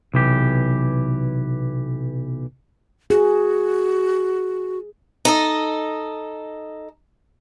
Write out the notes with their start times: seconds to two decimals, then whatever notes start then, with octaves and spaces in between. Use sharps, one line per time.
0.14 B1 C3 E3 G4
3.10 F#4 G#4
5.25 D#4 A4 D#5